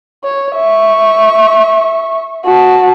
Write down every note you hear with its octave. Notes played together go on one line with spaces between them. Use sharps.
C#5
E5 C#6
F#4 A5